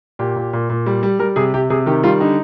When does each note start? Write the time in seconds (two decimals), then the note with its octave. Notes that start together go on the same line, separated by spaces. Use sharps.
0.19 A#2 G4
0.36 A#2
0.53 A#2
0.70 A#2
0.86 G3
1.03 G3
1.19 G3 A#4
1.36 C3 G#4
1.54 C3 G4
1.70 C3 G#4
1.86 D#3 G4
2.03 G3 F4
2.20 D3 D#4